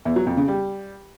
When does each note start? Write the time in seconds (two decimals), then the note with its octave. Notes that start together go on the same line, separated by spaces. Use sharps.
0.05 E2
0.16 F#3
0.27 F2
0.37 C#3
0.48 G3